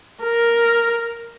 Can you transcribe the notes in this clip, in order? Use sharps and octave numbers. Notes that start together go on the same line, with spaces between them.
A#4